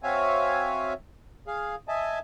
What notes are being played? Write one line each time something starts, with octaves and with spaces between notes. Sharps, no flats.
C4 F#4 C#5 E5 F5 G#5
G#4 F5
D#5 E5 G#5 A5